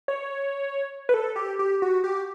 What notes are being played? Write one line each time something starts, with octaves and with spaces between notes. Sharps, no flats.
C#5
B4
A4
G4
G4
F#4
G4